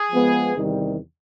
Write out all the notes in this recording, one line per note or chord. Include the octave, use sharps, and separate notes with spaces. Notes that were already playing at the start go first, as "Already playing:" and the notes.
Already playing: G#4
F3 G#3 B3
E2 C3 D#3 G3